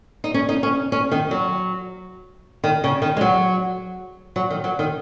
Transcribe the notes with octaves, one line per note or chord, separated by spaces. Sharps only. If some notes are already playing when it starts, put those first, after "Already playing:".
D#4
C#4
D#4
C#4
C#4
D#3
F#3
D#3
C#3
D#3
G#3
F#3
F#3
D#3
F#3
D#3